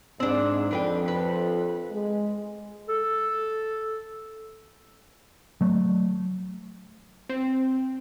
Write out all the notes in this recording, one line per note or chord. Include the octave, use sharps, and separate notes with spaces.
G#2 C4 D4
F2 D4 B4 G5
B4
G#3
A4
F#3 A3
C4